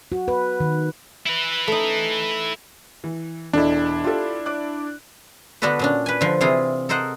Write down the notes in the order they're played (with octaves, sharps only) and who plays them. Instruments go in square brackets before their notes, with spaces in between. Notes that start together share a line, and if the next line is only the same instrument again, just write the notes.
[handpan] F#4
B4
D#3
[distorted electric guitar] E4 B4
[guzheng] A3 D#4
[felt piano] E3
[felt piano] E1 A4 D#5 [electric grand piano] D4 E4
[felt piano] F4 G4 A4
D5 D6 F#6
[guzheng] D3 B3 D4 F#4 A4 B4
A#2 C#4 D4
B4 G#5
D3 F3
C3 E3 E4 F4 G#4
A4 A#4 C5 D#5 F#5